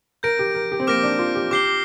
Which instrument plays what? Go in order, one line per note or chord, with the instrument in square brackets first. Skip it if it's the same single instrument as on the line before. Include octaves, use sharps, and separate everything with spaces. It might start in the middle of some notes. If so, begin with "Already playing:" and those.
[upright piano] A#4 [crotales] G6 A#6 D7
[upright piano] G4
A#4
G4
C4
[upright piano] A#3 [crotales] D6 F6 A#6 D7
[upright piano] D4
F4
G4
[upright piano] G4 [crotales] D6 G6 C7 G7